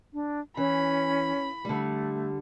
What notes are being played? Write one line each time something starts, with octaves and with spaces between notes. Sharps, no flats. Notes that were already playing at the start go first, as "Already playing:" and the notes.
D4
E3 C#4 B5
D3 G3 A3